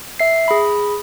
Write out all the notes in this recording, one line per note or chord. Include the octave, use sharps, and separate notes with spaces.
E5 C7
G#4 B5